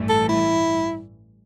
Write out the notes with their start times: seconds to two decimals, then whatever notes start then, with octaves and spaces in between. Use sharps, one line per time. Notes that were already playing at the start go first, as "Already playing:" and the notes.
Already playing: A1 G2 E3 A3
0.09 A4
0.29 E4